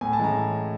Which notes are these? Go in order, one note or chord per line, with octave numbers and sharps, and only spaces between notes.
A2 G#5
A5
E3 G#3 C#4 A#5